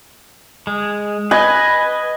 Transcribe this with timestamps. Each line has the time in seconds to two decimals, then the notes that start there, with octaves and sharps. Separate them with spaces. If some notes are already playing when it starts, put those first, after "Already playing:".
0.67 G#3
1.31 B4 D#5 G#5